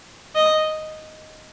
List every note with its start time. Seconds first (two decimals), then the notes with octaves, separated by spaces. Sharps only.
0.35 D#5